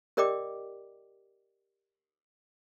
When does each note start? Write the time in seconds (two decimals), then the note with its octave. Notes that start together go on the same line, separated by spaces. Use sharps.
0.17 G4 A#4 D5 D#5 G5 D6